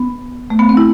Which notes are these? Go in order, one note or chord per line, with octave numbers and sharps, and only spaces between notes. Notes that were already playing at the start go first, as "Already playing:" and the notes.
Already playing: B3
A3
B3
C4
E4